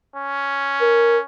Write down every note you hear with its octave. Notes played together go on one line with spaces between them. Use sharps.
C#4
A#4